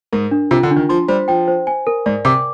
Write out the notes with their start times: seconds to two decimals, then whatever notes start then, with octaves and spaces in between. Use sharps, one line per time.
0.13 G#2 A#4
0.31 D4
0.51 C3 F4
0.63 D3
0.71 D4
0.76 D#3
0.89 F3 C6
1.08 G3 C5
1.28 F3 G5
1.48 C5
1.67 G#5
1.87 A#4
2.06 G#2 D5
2.25 C3 D6